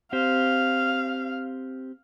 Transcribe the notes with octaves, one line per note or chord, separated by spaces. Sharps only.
C4 G4 C5 F5